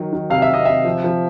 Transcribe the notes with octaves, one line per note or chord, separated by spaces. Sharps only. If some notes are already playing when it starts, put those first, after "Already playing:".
Already playing: D#3 F#3
D#3
C3 F5
E5
C3 D#5
C3 E5
F3
F3